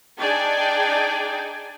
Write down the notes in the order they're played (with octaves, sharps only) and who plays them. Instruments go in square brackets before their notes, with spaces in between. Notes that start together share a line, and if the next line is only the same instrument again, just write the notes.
[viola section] D4 D#4 G#4 D5 G5 G#5